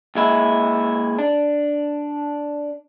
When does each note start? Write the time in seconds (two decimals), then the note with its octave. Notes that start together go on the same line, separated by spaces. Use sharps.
0.15 D#2 G#3 E4
1.19 D4